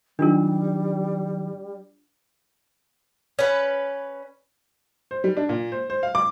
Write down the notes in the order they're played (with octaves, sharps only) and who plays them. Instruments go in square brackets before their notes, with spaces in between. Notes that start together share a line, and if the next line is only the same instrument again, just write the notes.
[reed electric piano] D#3 F#3 [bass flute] G3 [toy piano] D4 F4 A#4
[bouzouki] C#4 B4
[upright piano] C5
G3
D4
A#2
C5
C5
F5
D6